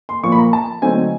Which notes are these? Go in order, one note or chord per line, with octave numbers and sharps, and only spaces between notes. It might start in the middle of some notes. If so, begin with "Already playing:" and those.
C6
A#2 F3 A#3 C#6
B5
A#5
A5
D3 F#3 A3 C4 D#4 G#5